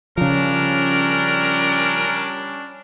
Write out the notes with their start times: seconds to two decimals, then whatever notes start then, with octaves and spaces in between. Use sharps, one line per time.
0.17 C#3 F3 G3 C#4 D4 A#4